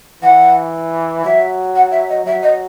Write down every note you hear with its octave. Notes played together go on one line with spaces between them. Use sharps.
E3 F#5
F#3 E5
F#5
E5
D#5
F#3 E5
D#5